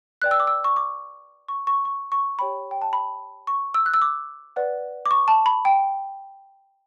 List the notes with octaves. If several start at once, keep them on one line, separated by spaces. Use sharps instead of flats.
B4 D5 G5 F#6
E6
D6
E6
C#6
D6
C#6
C#6
C#6
C#6
G4 C#5 G5 B5
G5
A5
B5
C#6
E6
F#6
E6
D6
B4 D5 F#5
D6
C#6
A5
B5
G5